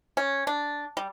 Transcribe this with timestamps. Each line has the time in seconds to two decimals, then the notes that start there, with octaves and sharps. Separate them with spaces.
0.17 C#4
0.47 D4
0.97 G3